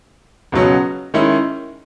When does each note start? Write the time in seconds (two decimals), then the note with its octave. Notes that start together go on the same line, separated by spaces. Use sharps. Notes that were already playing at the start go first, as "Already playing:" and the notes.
0.52 C#2 B2 F#3 C#4
1.14 D#3 G#3 C#4 E4